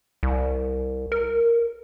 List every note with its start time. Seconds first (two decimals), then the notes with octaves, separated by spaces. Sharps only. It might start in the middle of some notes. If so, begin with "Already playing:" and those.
0.23 C2
1.12 A#4